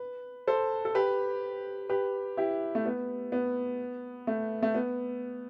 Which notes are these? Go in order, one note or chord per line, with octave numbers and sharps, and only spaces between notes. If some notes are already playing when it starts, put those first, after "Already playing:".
Already playing: B4
A4 C5
A4
G4 B4
G4 B4
E4 G4
A3
B3
B3
A3
A3
B3